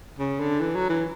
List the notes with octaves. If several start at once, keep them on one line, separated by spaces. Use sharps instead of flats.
C#3
D3
E3
F#3
E3